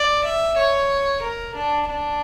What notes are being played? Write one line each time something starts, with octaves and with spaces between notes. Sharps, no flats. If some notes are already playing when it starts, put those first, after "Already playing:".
Already playing: D5
E5
C#5
A#4
D4
D4